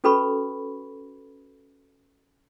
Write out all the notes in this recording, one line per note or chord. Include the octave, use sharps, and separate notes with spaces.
C#4 F#4 A4 B4 B5 C#6